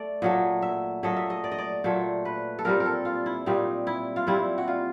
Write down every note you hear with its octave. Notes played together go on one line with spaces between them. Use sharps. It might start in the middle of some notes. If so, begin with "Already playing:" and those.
Already playing: A3 D5
A#2 F#3 A3 D#5
E5
A#2 F#3 A3 D#5
E5
D#5
D5
D#5
D5
A#2 F#3 A3 C5
B4
A4
A#2 G3 C4 A#4
A#4
A4
F4
E4
A#2 G3 C4 D#4
E4
F4
A#2 G3 C4 E4
F#4
F4